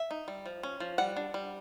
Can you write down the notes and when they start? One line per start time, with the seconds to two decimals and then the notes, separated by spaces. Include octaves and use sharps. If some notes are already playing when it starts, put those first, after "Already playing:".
Already playing: E5
0.11 D#4
0.28 G3
0.46 F3
0.63 C#4
0.80 F3
0.98 G3 F#5
1.17 D4
1.34 G3